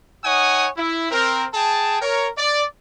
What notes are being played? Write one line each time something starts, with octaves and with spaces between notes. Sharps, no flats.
D#4 C#5 F#5 G#5 D#6
E4
C4 A#4
G#4 G5 A5
A#4 C#5
D5